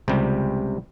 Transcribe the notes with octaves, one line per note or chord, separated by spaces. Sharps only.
C#2 C3 G3